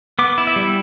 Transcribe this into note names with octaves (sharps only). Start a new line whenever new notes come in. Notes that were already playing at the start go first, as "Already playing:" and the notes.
B3 D6
E4
E5
G3